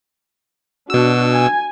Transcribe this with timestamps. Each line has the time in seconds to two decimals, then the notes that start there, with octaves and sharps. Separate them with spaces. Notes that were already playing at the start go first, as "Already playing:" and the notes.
0.90 B2 D4 F#4 E6
1.33 G#5